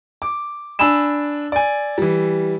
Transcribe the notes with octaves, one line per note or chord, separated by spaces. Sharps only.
D6
D4 G#5 B5 E6 E7
D5 G#5
E3 G3